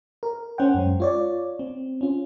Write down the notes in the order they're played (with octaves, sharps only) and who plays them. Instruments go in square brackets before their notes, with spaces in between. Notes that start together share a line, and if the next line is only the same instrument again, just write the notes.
[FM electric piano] A#4
C#4 C5 F#5 G5
F#2 G#3
F4 C#5 D5
C4
C#4 F4